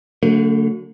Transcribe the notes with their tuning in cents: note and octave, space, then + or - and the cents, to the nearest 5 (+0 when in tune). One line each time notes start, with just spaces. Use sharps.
D3 -25 F#3 +0 A3 +40